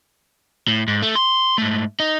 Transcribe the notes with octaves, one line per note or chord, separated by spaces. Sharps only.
A2
G#2
A3
C6
G#2 A3
D#4